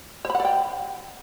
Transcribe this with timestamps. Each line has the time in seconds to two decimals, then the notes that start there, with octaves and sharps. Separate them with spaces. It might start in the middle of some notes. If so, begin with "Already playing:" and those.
0.25 C5
0.30 B5
0.35 F#5
0.40 D5
0.45 G5